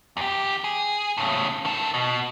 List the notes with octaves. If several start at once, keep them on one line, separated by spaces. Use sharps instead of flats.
E2 G4
G#4
A2 C#3
D#3 A4
B2